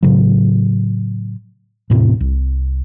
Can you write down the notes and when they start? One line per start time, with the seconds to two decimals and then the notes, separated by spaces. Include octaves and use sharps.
0.03 A2 C#3 F#3
1.90 E2 A2 C3
2.20 C2